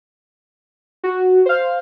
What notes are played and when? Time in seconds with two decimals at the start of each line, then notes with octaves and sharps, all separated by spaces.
1.04 F#4
1.46 C5 F5